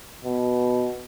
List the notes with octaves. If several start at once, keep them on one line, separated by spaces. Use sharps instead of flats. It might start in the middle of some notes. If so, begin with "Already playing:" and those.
B2